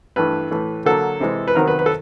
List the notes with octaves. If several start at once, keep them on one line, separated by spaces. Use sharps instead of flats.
G2 E3 A3 B4
A2 E3 A3
D3 F#3 A#3 A4
C3 E3 G#3
B4
C3 D#3 F#3 B3 A#4
B4
B4
A4